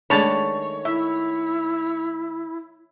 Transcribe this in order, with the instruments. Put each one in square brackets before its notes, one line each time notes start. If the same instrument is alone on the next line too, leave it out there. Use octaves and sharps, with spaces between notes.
[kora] D#3 G#3 A3 [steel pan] D4 A5 B5 [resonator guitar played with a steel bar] C#5
[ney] E4 [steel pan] E5